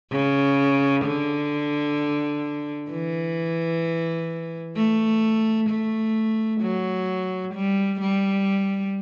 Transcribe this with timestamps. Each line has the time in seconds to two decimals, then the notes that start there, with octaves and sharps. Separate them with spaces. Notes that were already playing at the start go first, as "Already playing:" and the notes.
0.12 C#3
1.05 D3
2.91 E3
4.76 A3
5.70 A3
6.61 F#3
7.54 G3
8.01 G3